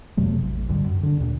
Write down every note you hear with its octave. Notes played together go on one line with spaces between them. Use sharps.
F2 C3 F#3 A3
A1
C#2 G#2 D3 G3
F#2
D3 D4
D#2 A#2